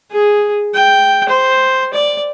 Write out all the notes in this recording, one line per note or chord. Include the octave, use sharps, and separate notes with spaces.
G#4
G5
C5
D5